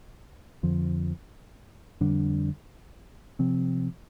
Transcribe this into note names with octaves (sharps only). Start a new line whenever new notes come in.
F2 D3 F3
F2 D3 G3 D4
C3 F3 C4